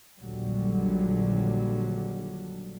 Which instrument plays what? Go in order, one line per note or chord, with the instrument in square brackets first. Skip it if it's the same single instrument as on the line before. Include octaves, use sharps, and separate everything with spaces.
[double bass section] A#1 D#2 A#2 D3 F#3 G3